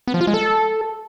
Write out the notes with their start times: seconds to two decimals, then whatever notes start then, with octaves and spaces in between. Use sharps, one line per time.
0.07 B3
0.14 F3
0.21 F4
0.27 G#3
0.34 A4